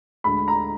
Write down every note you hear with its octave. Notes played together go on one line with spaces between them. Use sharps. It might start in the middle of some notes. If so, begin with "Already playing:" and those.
D2 D3 G#3 B5
A#5